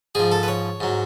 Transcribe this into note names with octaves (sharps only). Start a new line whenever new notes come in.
G#2 F3 G#4
A4
B4
C#5
G#2 F#3